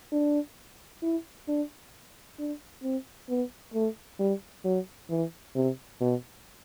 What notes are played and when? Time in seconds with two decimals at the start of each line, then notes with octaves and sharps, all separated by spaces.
0.12 D4
1.02 E4
1.48 D4
2.39 D4
2.83 C4
3.29 B3
3.74 A3
4.19 G3
4.64 F#3
5.10 E3
5.55 C3
6.01 B2